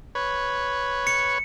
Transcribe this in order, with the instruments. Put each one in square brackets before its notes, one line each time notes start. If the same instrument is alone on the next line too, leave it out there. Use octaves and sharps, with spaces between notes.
[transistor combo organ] B4 C#5
[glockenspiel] C#7